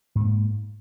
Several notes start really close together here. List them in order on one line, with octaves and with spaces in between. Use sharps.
G#2 B3 A#3